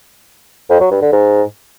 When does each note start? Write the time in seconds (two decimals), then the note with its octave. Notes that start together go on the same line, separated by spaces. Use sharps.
0.70 F2
0.80 F#3
0.91 G2
1.02 D3
1.12 G#2